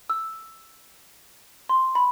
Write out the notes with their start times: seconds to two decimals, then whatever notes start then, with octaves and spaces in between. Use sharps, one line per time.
0.10 E6
1.69 C6
1.95 B5